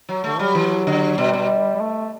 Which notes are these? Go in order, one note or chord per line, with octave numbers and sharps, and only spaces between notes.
F#3
D3 A3
F#3 G3
E3
D3
B2 G3
B2
G3
A3